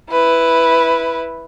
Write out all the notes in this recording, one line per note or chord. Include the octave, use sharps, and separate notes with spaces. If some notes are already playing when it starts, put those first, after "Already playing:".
E4 B4